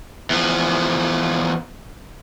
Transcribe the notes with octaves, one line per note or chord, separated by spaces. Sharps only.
E2 F3